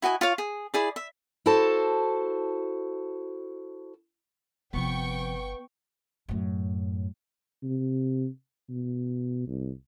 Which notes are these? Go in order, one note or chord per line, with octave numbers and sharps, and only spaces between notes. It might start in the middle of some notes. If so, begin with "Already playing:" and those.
E4 F#4 D#5 G#5
F4 C#5 F5
G#4
E4 G#4 D5
E5
E4 F#4 A4 C5 A5
G1 C3 F3 B3 G5 C#6
F#2 A2
C3
B2
C2